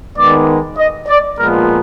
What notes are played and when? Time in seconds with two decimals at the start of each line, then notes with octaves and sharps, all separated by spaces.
0.16 D#3 G#3 B3 D5
0.77 D#5
1.08 D5
1.38 A#2 F3 G#3 B3 A#4